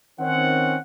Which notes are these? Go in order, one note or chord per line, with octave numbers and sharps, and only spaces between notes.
D#3 C4 C#4 F#5